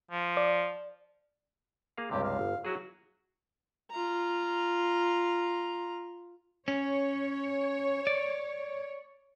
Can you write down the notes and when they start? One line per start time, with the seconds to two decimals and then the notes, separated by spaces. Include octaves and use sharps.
0.11 F3
0.37 D5
1.97 A#3 G#4 F5
2.11 C#2 G2 C3 G4
2.24 F5
2.39 G1
2.65 F#3 E4 F#4 G#4
3.91 F4 A#5
6.68 C#4 C#5
8.07 D5